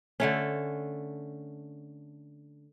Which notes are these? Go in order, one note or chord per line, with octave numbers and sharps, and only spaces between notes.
D3 A3 C#4